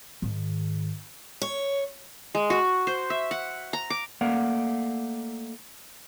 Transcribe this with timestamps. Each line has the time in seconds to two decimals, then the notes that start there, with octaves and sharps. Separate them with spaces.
0.22 G#2 D#3
1.42 C#5
2.35 G#3
2.50 F#4
2.87 C5
3.10 E5
3.31 F#5
3.73 A#5
3.90 D6
4.21 A3 A#3 D5 F5 F#5